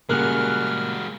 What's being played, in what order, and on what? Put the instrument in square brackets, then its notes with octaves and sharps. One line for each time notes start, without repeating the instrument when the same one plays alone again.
[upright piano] A#2 C#3 G3 [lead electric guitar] G#3 F#4 [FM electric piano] A#4 F#6 [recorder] F6